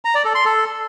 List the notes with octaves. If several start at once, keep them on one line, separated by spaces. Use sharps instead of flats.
A#5
D5
A4
C6
A4